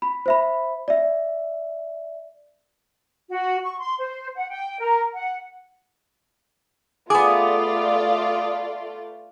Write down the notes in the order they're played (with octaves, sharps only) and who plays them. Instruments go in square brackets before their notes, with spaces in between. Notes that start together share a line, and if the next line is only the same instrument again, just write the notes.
[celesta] B5
C5 E5 B5
D5 E5
[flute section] F#4
C#6
C6
C5
F#5
G5
A#4
F#5
[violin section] A3 F4 D5 [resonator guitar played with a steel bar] B3 G#4 [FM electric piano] D6 D#6